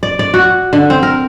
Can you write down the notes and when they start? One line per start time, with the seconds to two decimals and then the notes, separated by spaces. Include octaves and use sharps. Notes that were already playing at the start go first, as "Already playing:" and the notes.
0.03 D5
0.19 D5
0.34 F#4
0.73 D3
0.90 C4
1.03 A#4